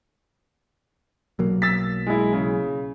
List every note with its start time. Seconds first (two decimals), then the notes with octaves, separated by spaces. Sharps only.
1.39 B1 F#3 A#3
1.62 E6 A6 B6
2.06 G#3 E4
2.33 C#3